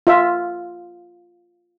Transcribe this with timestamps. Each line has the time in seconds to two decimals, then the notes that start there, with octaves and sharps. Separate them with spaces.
0.07 F4 E5